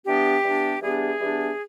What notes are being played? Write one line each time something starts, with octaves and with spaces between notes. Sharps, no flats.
E3 G3 B3 D4 G4
E3 G3 B3 D4
E3 G3 B3 D4 G#4
E3 G3 B3 D4